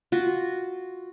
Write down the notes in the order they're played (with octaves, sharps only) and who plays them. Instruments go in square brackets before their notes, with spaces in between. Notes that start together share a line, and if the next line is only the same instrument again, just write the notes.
[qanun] F4 F#4